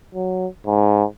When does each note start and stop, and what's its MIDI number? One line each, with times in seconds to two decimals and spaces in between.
0.15 0.47 54
0.67 1.04 44